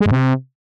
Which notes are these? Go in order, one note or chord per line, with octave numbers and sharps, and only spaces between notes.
G#3
G#2
C3